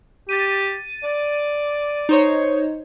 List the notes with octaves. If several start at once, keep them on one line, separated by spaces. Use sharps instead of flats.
G4 A6 D#7
D5
D#4 C5 C#5